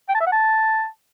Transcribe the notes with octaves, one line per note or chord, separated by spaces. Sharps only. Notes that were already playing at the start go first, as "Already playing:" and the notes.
G5
A5
E5
F#5
A5